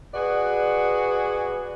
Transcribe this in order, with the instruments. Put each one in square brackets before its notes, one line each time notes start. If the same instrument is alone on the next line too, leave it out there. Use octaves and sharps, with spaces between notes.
[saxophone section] F#4 G#4 B4 D5